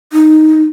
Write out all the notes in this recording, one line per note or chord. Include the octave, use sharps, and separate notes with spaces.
D#4